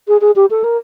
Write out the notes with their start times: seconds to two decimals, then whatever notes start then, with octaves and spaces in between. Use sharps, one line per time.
0.08 G#4
0.21 G#4
0.36 G4
0.50 A4
0.64 A#4